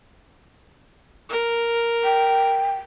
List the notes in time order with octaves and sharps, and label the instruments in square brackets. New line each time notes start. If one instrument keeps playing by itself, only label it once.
[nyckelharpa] A#4
[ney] G5